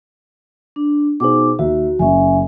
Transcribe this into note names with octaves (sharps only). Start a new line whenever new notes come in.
D4
B2 D#4 G#4 C5 D6
D#2 F#4 E5
F#1 C#4 E5 G#5